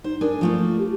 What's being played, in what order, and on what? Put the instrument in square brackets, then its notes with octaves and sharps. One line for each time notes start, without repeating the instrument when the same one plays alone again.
[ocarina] D#4 [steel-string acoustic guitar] C5
[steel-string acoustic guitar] D4 G#4 G#5 [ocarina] A#4
[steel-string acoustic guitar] F3 A3 A#3 [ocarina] F4
[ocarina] G4